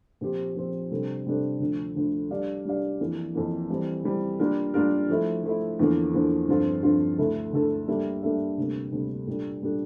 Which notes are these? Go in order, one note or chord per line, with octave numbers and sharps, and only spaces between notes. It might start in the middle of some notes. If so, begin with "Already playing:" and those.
A#2 F3 C4 G4 C5
A#2 F3 C4 G4 C5
C3 G3 D4 A4 C5
C3 G3 D4 A4 C5
D2 D3 F3
D2 D3 F3
G3 D4 G4 D5 F5
G3 D4 G4 D5 F5
F2 E3 A#3
F2 E3 A#3
E3 G3 C4
E3 G3 C4
G3 A#3 D4 F4 A#4
G3 A#3 D4 F4 A#4
F3 A3 E4
F3 A3 E4
E2 D3 F3 A#3
E2 D3 F3 A#3
G2 D3 F3 C4 F4
G2 D3 F3 C4 F4
D2 D3 A3 E4 A4
D2 D3 A3 E4 A4
G3 A#3 D4 A4 E5
G3 A#3 D4 A4 E5
D2 C3 G3 A#3
D2 C3 G3 A#3
A#2 G3 D4 A4
A#2 G3 D4 A4